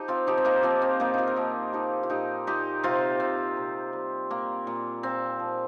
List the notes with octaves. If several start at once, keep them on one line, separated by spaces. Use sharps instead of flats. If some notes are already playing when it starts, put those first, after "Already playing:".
Already playing: F3 D#4 G4
C4 F4
F3 D#4 G4
C4
A#3 D#4
F3 C4 F4
C4
A#2 A#3 D#4
C4 D#4 F4
A#4
F3 D#4 G4
F3 D#4 G4
F4
A#2 D#4 G4
A#2 D#4 G4
C3 C4 F4
C3 C4
C3
G3
A#2 A#3
A#2
A#2 C4
F3